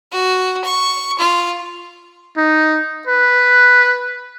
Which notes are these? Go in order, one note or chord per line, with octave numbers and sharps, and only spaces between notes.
F#4
C#6
F4
D#4
B4